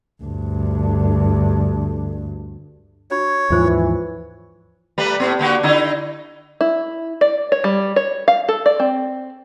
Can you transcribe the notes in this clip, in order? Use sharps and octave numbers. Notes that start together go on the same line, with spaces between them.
D2 G2
D4 F#4 C#5 B5
D#2 G#2 E3 F3 F4 G#4 C5
G3 A3 B4
A2 B3
D3 A#3 F#4
D3 D#4 E4
E4
D5
C#5
G3
C#5
F5
A4
D5
C4